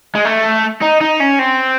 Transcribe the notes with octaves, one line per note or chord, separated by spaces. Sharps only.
G#3
A3
D#4
D#4
C#4
C4